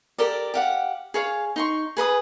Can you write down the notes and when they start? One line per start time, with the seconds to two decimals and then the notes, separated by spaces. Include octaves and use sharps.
0.18 G4 A4 A#4 D5
0.54 G4 F5 F#5
1.14 G#4 C#5 F5
1.56 D#4 C6 C#6
1.97 G#4 B4 A#5 D#6